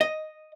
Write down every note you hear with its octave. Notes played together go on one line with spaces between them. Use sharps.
D#5